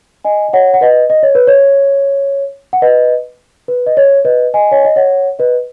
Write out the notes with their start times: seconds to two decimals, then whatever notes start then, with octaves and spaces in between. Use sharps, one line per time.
0.24 D#5 G#5
0.49 D#5
0.53 C#5 F#5
0.74 F#5
0.81 B4 D#5
1.10 D#5
1.23 C#5
1.35 B4
1.47 C#5
2.73 F#5
2.82 B4 D#5
3.68 B4
3.86 D#5
3.97 C#5
4.25 B4 D#5
4.54 D#5 G#5
4.72 C#5
4.85 D#5
4.96 C#5 F#5
5.39 B4 D#5